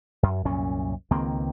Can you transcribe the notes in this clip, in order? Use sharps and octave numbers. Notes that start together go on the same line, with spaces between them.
F#2
C2 F#2 A#2 C#4
C#2 D#3 A#3 C4